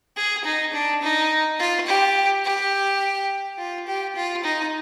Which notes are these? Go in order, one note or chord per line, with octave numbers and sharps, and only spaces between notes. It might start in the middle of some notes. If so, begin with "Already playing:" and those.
G#4
D#4
D4
D#4
F4
G4
G4
F4
G4
F4
D#4